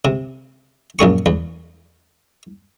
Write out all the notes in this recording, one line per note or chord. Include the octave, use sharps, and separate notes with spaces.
C3
A#1 F#2 G#4 C#6
E2